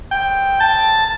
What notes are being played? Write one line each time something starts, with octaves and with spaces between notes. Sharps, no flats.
G5
A5